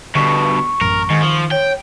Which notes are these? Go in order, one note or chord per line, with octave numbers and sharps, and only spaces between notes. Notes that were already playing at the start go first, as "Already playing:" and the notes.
G2 B2 D3 C#6
A1 F#2 A#4
G#2 D#3
F3
C#5 G5